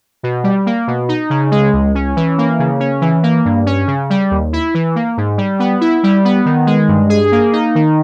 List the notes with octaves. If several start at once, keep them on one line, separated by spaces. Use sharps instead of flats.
B2
G3
A#3
B2
D#4
C#3
G#3
C#2
C#4
E3
A#3
C#3
C#4
E3
A#3
G2
C#4
C#3
G3
D#2
E4
E3
A#3
G#2
G3
B3
E4
G3
B3
D#3
G#3
G2
G#4
A#3
D#4
D#3